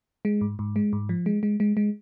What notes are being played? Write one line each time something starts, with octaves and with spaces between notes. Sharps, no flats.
G#3
G#2
G#2
G#3
G#2
F3
G#3
G#3
G#3
G#3